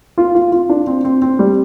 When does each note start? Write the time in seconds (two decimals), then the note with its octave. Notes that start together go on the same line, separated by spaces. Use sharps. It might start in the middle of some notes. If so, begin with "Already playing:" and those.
0.18 F4
0.35 F4
0.52 F4
0.69 D4
0.87 C4
1.05 C4
1.22 C4
1.39 G3